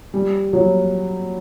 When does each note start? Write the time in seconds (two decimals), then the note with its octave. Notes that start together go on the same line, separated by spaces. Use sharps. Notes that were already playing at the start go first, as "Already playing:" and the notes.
0.14 G3
0.53 F#3